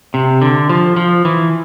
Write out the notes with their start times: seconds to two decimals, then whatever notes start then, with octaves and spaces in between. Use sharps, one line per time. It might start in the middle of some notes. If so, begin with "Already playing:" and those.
0.14 C3
0.42 D3
0.69 F3
0.96 F3
1.25 E3